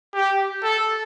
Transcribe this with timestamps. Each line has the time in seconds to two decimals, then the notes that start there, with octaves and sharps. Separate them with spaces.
0.14 G4
0.63 A4